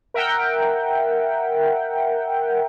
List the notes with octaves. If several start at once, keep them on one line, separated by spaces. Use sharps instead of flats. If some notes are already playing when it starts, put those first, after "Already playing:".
A#4 E5 F#5 G5